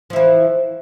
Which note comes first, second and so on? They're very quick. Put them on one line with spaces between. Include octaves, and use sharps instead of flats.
F3 E4 E3